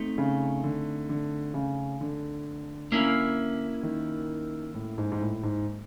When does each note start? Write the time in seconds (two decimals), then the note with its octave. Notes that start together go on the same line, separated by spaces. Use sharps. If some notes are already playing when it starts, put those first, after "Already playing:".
Already playing: A3 C4 D#4
0.18 C#3
0.64 D3
1.09 D3
1.54 C#3
2.01 D3
2.92 A#3 C#4 E4
3.83 D#3
4.74 A2
4.98 G#2
5.12 G#2
5.21 A2
5.43 G#2